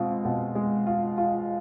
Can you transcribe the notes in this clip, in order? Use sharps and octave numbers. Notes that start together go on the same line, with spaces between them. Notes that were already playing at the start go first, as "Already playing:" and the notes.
Already playing: B2 G#3 C4 F4
B2
G#3
F4
F4